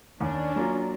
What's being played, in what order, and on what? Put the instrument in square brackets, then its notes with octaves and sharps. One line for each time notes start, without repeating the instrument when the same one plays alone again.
[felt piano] D#2 [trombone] C#4 [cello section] D4
[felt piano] F#3 A#3 F4